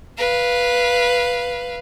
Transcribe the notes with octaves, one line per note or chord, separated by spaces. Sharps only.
B4 F5